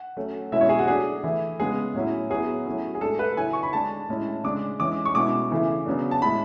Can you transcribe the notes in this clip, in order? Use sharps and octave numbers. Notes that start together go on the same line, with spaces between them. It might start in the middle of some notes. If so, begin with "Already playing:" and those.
Already playing: F#5
F#3 A3 C#4
B2 G#3 C#4 E4 E5
C#5
G#4
F#4
F#3 A3 D4 G#4
E3 A3 E4
C#3 G#3 B3 G#4
A2 F#3 C#4 E4
F#3 B3 E4 G#4
F#3 A3 C#4 E4
G#4
A2 G#3 D4 A4
B4
C#3 F#3 C#4 E4 G#5
C#6
B5
D3 G#3 D4 A5
A2 G#3 C#4 E4
C#3 G#3 D4 D6
E3 G#3 C#4 D6
C#6
B2 G#3 C#4 E4 D6
C#3 E3 A3 E4
C#3 F#3 B3 D4
A5
A2 G#3 C#4 E4 B5